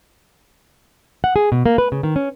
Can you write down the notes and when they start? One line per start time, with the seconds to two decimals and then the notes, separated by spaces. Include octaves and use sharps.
1.24 F#5
1.36 G#4
1.52 B2
1.66 A#3
1.78 B4
1.92 C#3
2.03 D#3
2.16 C#4